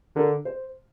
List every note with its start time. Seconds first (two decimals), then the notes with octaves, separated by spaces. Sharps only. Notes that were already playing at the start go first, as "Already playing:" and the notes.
0.16 D3 A#4
0.45 C5